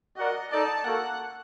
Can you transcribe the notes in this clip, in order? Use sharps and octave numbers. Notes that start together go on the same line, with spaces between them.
F#4 A#4 D5 D#5 F#5
D#4 A4 D5 A5
A#3 F#4 A4 F#5